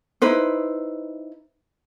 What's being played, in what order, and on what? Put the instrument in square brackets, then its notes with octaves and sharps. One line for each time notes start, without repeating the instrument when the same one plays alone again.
[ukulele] D#4 E4 B4 C5